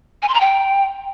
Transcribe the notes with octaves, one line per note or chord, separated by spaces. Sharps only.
G#5
C6
A#5
G5